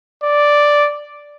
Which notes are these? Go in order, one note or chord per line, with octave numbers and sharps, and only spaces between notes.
D5